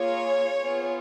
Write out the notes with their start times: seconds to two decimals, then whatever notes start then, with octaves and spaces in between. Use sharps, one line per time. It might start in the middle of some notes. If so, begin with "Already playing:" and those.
Already playing: A#3 F4 G#4 C#5
0.60 B3 F4 G#4